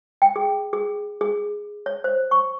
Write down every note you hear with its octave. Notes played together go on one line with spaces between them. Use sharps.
G5
G#4
G#4
G#4
C#5
C5
C#6